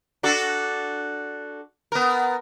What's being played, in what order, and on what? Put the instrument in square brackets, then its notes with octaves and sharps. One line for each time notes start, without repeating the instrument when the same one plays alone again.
[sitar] D4 F#4 A4
B3 A#4